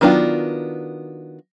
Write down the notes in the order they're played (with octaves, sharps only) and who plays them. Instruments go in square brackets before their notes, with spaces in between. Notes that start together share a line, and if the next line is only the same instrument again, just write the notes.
[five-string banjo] D#3 F#3 B3 D4 F4